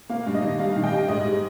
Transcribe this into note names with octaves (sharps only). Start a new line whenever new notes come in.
A#3 F5
G2
D#5
D#3
G3 F5
D#3
D#5 G5
G3
G#2 D#5
G3